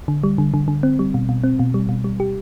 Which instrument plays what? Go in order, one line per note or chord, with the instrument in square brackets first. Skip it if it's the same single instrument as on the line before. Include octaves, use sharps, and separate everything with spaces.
[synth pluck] D3
G3
D3
D3
D3
C4
G3
B2
B2
C4
B2
G3
B2
G3
G4